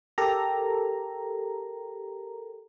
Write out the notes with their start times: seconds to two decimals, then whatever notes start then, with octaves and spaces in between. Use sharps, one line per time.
0.18 G4 A4 A#4 A#5